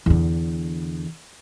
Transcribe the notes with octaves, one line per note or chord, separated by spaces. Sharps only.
E2 D3